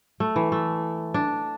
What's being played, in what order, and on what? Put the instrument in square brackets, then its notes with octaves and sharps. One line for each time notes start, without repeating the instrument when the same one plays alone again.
[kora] A3
E3
A3
D4